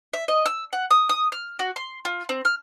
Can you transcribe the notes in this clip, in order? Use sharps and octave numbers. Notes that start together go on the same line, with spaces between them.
E5
D#5
E6
F#5
D#6
D#6
F6
F#4
C6
F4
C4
F6